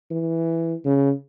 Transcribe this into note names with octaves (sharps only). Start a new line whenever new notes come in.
E3
C#3